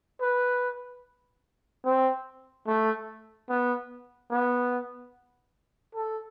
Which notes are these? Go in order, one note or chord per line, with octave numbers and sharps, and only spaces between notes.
B4
C4
A3
B3
B3
A4